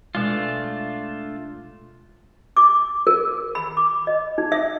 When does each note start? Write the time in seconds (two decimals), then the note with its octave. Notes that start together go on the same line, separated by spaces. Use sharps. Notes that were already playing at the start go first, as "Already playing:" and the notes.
0.15 B2 G#3 A3 D4 F4
2.57 D6
3.07 A#4
3.55 B5
3.77 D6
4.07 D#5
4.38 D#4
4.52 E5